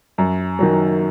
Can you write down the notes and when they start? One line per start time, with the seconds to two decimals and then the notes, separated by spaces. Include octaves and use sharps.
0.18 F#2
0.59 D#3 F#3